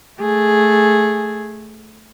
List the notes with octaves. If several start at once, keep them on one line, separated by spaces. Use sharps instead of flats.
A3 G#4